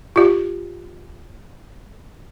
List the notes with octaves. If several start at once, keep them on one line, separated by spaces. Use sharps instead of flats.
F4 G4